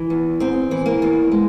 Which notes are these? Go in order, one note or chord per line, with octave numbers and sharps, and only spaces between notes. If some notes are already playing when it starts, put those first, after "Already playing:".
Already playing: E3
E2
E2 C4
E3
A#3
E2
G#3